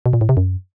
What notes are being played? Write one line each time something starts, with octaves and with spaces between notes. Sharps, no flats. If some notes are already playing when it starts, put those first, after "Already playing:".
B2
A#2
A2
C3
F#2